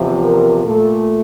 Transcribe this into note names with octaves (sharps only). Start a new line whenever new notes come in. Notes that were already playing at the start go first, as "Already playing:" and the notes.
Already playing: E2 C3 F3
A#4
A#2 A3 A4